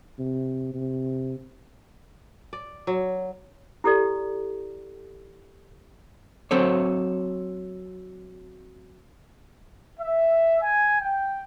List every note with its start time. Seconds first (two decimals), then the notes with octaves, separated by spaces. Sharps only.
0.19 C3
0.74 C3
2.53 D5
2.87 F#3
3.84 E4 G4 A4 D5
6.51 F#3 C4 A4 C#5
10.00 E5
10.62 G#5
11.01 G5